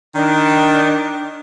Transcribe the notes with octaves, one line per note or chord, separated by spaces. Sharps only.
D#3 D4